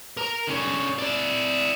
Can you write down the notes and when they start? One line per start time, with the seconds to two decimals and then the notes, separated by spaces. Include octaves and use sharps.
0.17 A#4 A#5
0.47 D3 C#4
0.99 E4 D5